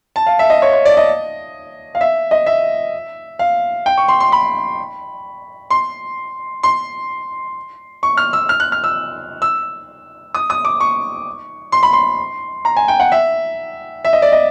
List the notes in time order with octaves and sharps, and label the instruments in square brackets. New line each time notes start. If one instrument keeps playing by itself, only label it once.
[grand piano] A5
F5
E5
D#5
C#5
C#5
D5
D#5
F5
E5
D#5
E5
F5
G5
C#6
C6
C6
B5
C6
C6
C#6
F6
E6
F6
F#6
F6
E6
E6
D#6
D#6
D6
C#6
C6
B5
C6
A#5
G#5
G5
F#5
E5
E5
D#5
D5
D#5